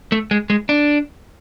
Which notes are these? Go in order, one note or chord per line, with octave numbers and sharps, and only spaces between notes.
A3
G#3
G#3
D4